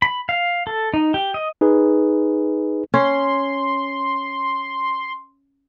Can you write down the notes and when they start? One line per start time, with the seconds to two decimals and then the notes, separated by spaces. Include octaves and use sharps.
0.02 B5
0.29 F5
0.67 A4
0.94 D#4
1.14 G4
1.34 D#5
1.61 D#4 G#4 B4
2.94 C#4 C6